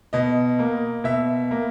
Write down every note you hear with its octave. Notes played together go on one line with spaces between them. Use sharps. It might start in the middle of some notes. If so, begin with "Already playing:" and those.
B2 D#5
A#3
B2 E5
A#3